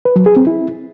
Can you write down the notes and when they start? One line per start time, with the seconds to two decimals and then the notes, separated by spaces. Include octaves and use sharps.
0.05 B4
0.16 F#3
0.26 G#4
0.36 C4
0.47 E4